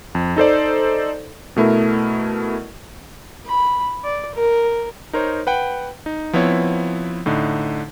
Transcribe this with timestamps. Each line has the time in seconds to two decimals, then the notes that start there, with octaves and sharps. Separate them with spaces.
0.15 F2
0.36 D#4 A4 C5 D5
1.56 B2 A3 E4 A#4
3.46 B5
4.04 D5
4.35 A#4
5.13 D#4 A#4 C5 C#5
5.47 B4 F#5 G5
6.06 D#4
6.33 F3 B3 C4 E4 C#5
7.26 A2 D3 D#4